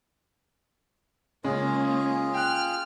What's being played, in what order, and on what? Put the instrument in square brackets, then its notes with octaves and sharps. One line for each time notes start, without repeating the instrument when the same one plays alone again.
[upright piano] C#3 [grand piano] G#3 [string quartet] A#3 C#4 [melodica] F4 G#4
[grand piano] G5 F#6 [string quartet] F6